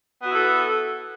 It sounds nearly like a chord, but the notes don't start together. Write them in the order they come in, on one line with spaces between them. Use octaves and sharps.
B3 F#4 E4 A4